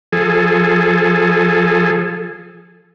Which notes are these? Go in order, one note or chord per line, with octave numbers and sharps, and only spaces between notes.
F3 G#4 A4